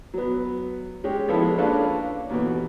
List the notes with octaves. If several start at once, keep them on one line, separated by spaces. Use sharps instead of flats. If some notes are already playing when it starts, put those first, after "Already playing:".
F#3 B3
G#3 C#4 G4
F3 B3 E4 A4
G#3
A#3 C#4 D4 F4 A4 B4
D#2 B2 E3